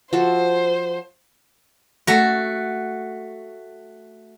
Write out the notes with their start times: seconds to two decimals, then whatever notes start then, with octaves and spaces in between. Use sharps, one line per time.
0.13 F3 F#4 A4 C5
2.07 A3 F#4